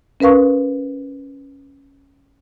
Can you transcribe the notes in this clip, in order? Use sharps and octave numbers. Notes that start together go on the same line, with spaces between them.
C#4 A#4 B4 F5 C#6